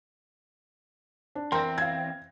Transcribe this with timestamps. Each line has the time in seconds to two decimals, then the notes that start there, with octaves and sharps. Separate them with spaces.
1.35 D4
1.52 E2 C4 A#4 G5 C6
1.78 F5 G#6